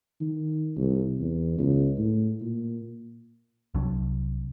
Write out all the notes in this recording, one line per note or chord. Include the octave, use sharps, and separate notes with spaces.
D#3
C2
E2
C#2
A2
A#2
C2 C3 F#3 D4